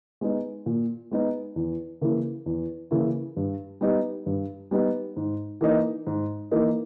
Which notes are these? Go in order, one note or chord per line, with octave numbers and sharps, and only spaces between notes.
G#3 B3 D#4
A#2
G#3 B3 D#4
E2
C#3 E3 A#3 E4
E2
C#3 E3 A#3 E4
G2
G3 B3 D#4
G2
G3 B3 D#4
G#2
E3 A#3 D#4
G#2
E3 A#3 D#4